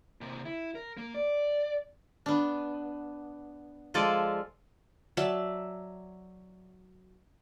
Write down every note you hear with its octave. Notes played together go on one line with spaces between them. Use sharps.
C3 A#3
E4
A#4
A#3
D5
B3 D4
F3 G#3 F4 A4 D5 G#5
F#3 D5 E5 A5